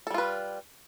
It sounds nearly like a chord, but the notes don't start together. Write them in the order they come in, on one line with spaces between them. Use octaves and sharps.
A4 G3 F4 B4